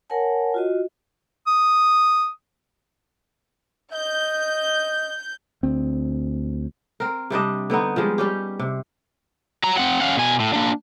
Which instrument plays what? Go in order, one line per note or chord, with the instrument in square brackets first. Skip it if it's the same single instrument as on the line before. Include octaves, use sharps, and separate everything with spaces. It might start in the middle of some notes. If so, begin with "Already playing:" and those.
[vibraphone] A#4 C#5 F#5 G#5 A5
F4 F#4 D#5
[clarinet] D#6
[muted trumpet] D#5 [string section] G6
[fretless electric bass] D2 C4
[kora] C4 A#4
C3 G3 D4 D#5
D3 B3 C4 D#4
F3 G3 G#3
G3 C#4 G4
C3
[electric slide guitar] F#3 A#5
C4 F#5
C#4 F5 F#5
B2 G#5
A2
A#3 D4